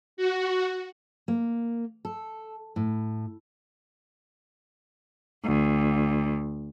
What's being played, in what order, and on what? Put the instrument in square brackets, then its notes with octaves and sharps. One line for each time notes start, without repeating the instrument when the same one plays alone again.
[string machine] F#4
[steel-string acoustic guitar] A#3
A4
A2
[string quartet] D2